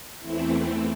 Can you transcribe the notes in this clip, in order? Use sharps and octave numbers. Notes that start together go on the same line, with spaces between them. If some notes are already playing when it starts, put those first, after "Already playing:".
E2 E3 A3 C4 E4